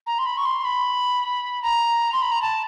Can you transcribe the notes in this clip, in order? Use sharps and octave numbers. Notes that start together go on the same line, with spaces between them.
A#5
C6
B5
C#6
C6
B5
A#5
C6
B5
A#5
A5